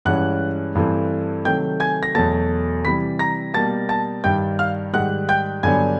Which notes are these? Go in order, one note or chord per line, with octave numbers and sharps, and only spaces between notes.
G2 E3 G#3 C#4 F#5 F#6
G2 E3 A3 C4
C3 D#3 F#3 A3 G5 G6
G#5 G#6
A#6
E2 B2 F#3 A3 A5 A6
C3 E3 G3 B5 B6
A#5 A#6
B2 G3 A#3 A5 A6
A5 A6
G2 D#3 G3 G5 G6
F5 F6
G#2 D#3 G3 F#5 F#6
G5 G6
G2 D3 F#3 B3 D4 G#5 G#6